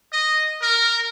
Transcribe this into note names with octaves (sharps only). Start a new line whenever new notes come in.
D#5
A#4